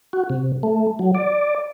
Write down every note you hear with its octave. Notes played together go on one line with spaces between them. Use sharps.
F#4
C3
A3
F#3
D5